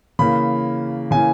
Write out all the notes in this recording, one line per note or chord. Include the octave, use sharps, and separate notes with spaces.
C#3 E3 A#3 B5
C#3 E3 A#3 G#5